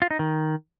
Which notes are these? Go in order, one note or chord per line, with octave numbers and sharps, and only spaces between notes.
F4
D#4
D#3